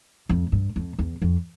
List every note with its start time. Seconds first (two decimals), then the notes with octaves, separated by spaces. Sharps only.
0.29 F2
0.52 G2
0.76 F2
0.99 E2
1.22 F2